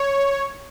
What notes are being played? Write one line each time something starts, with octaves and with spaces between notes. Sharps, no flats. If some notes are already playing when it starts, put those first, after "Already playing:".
Already playing: C#5